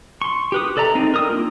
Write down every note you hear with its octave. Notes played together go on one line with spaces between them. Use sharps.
C6 C#6
G4 B4 D#6
A4 D5 E5 A#5
C4 D#4
A#4 D#6 E6
A#3 D4 F4